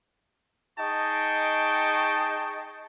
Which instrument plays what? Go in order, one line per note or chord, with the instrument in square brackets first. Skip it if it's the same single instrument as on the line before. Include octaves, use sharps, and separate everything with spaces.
[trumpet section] D#4 G#4 D#5 G5 A5 C#6